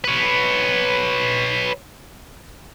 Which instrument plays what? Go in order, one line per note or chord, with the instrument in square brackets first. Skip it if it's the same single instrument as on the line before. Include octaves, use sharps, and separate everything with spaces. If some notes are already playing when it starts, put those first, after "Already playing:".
[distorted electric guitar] B4 C#5